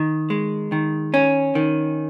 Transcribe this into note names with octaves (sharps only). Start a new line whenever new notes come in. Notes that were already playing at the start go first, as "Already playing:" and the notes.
Already playing: D#3
G#3
D#3
C#4
D#3